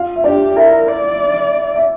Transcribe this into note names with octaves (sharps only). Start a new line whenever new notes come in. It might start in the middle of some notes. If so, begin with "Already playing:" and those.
Already playing: F4 F5
E5
D4 G4 D5
E4 A#4 E5
D5
E5